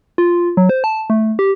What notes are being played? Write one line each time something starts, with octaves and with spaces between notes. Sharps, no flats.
F4
F#3
C5
A5
A3
G4